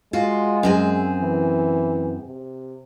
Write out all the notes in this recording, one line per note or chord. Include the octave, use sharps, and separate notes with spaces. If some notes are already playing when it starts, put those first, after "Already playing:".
G#3 F4 F#4
F#2 C4 G#4
E3
C3